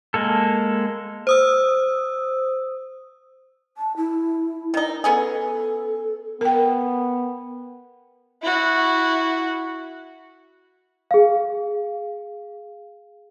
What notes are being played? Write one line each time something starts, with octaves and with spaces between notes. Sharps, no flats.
G#3 A#3 A4
C5 D#6 E6
A5
E4
D#3 D#4
B3 C#4 G#4 A4
B3 A#4 G5
E4 F#4
G#4 F5